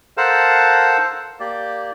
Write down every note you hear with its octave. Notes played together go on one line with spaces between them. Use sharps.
A4 A#4 C5 F5 F#5 A5
A#3 G4 D5